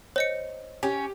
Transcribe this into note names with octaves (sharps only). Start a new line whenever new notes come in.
C5 C#5 D#5 C#7
C#4 G4